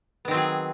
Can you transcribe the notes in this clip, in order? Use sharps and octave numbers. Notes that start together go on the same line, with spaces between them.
D#3 F#3 B3 C4 G#4